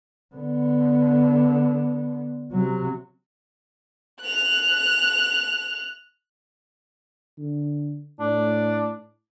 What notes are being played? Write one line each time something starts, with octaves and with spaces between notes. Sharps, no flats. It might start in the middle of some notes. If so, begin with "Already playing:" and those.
D3 B3
C3 F#3
F#6 F7
D3
A2 D4